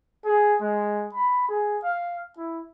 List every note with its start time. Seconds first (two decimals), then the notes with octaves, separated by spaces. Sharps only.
0.25 G#4
0.61 G#3
1.14 B5
1.48 G#4
1.83 F5
2.37 E4